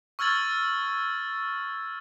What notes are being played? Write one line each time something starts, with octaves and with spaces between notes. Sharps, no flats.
C#6 E6 F6 G#6 A6 F#7